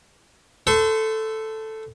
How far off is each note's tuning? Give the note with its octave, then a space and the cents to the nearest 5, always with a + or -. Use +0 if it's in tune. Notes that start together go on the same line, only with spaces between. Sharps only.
A4 +0 C5 -35 C#6 -10